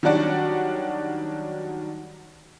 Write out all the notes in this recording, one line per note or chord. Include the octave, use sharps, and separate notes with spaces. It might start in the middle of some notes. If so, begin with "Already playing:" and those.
D#3 F#3 G3 D4 F#4 D5